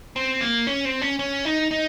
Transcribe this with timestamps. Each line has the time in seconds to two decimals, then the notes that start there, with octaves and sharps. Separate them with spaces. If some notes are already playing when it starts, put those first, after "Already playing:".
0.16 C4
0.41 A#3
0.67 C#4
0.85 C4
1.01 C#4
1.19 C#4
1.45 D#4
1.71 D#4